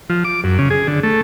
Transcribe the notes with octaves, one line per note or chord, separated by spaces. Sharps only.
F3
D6
F#2
C#3
G#4
D3
A3